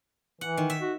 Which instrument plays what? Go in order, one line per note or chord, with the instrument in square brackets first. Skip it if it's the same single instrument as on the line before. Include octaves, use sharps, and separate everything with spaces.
[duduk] E3 [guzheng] F#5
[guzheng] D#3
E5
[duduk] F#4